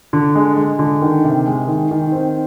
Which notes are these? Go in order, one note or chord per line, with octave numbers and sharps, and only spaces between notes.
D3
G#3
G#3
D3
D#3
C3
G#3
D#3
D#3
C4